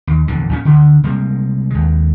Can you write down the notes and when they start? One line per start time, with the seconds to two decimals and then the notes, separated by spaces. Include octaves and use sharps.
0.07 D#2
0.28 A#1 E2 D3
0.49 A#1 A#2 D#3 C#4
0.65 D2 D3
1.04 C3 G3 G#3 A#3
1.70 D#2 G#3